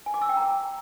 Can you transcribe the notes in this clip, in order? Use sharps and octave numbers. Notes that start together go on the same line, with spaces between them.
G#5
D6
E6
G5
A#5